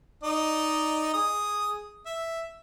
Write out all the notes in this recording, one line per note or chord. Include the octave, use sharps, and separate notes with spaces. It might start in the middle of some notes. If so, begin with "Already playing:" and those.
D#4 D5 D#5
G#4 D#6
E5